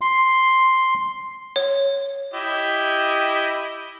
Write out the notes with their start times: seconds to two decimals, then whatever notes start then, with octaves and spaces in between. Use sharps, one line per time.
0.01 C6
1.56 C#5
2.34 E4 G4 D#5